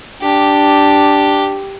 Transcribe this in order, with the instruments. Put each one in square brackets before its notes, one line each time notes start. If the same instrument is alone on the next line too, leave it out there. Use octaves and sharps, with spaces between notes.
[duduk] D4 [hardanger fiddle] G4